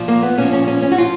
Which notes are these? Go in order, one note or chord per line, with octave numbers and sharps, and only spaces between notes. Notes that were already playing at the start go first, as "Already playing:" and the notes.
Already playing: A#2 F3
A#3
B3
A#2 F3 C#4
C#4
C#4
C#4
F#4
F3 F4